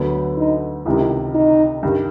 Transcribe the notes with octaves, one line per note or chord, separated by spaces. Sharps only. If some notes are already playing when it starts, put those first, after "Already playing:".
Already playing: D2 D3 F#3 B3
D#4
C#2 C3 D#3 E4
D#4
G2 D#3 G3